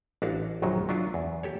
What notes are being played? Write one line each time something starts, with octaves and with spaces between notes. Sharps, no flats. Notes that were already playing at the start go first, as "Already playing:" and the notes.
A1 D4 E4 F#4 F5
A#1 F#2 D#3 F#3 F#4
F#3 D4 E4 F4
E2
G4 A4 C#5